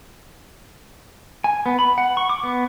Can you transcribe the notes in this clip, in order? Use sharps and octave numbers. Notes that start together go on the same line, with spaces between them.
G#5
B3
B5
F#5
C#6
D6
B3